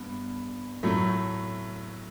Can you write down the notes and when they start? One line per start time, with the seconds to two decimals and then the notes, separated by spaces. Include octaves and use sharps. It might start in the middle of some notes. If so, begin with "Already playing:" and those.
Already playing: G2 B3
0.83 A2 F#3 A3